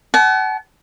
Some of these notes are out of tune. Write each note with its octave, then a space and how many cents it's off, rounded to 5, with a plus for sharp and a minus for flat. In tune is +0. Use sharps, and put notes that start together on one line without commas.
F#5 +35 A5 -40